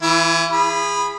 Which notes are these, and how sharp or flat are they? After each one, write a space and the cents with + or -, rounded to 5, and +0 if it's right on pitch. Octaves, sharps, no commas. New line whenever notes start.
E3 +0 E4 +35
G#4 -25 B5 +0